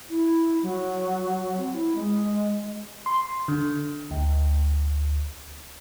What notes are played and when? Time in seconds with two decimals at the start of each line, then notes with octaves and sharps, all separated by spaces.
0.10 E4
0.63 F#3
1.57 C4
1.73 E4
1.95 G#3
3.06 C6
3.48 D3
4.11 D2